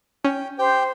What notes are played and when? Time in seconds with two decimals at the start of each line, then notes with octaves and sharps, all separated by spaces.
0.25 C#4 G5
0.59 G4 C5 G5